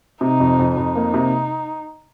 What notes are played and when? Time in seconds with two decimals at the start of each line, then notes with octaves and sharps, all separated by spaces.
0.21 C3 D#4
0.40 F2
0.59 F2
0.77 F2 D#4
0.96 A#3
1.14 C3